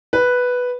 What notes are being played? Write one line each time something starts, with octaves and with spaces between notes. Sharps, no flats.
B4